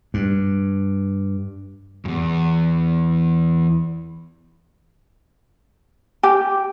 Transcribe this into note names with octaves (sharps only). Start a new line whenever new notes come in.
G2
E2 G2
G4